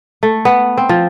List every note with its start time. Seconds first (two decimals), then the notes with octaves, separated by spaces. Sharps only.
0.23 A3
0.45 B3
0.78 C4
0.89 F3